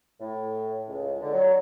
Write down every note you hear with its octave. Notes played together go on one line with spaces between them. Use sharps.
A2
C#2
D3
F#3